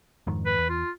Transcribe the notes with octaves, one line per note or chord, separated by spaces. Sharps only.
F2 G#2 D#3
B4
E2
F4